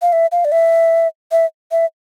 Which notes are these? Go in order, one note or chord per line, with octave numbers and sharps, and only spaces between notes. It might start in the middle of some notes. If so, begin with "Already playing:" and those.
F5
E5
F5
D5
E5
E5
E5